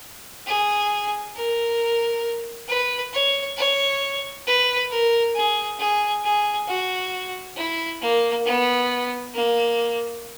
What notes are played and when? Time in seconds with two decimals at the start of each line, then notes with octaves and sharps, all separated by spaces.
0.46 G#4
1.35 A#4
2.68 B4
3.13 C#5
3.57 C#5
4.47 B4
4.90 A#4
5.35 G#4
5.79 G#4
6.24 G#4
6.68 F#4
7.57 E4
8.01 A#3
8.46 B3
9.34 A#3